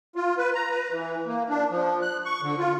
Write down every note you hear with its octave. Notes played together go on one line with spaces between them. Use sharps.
F4
B4
A#5
B4
E3
A#3
D4
F3
F#6
C#6
D3
F4